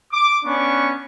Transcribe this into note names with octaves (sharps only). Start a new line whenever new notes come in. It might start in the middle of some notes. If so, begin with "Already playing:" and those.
D6
B3 C#4 D4 C#6